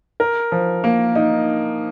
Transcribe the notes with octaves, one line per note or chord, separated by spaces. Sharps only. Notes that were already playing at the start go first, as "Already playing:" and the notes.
A#4
F3
A#3
D#4